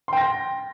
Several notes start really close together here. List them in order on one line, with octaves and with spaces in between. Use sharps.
C6 G5 A#6